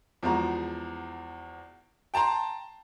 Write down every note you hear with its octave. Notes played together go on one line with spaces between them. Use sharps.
E2 F3 G#3 F#4 A#5
G5 A5 A#5 C6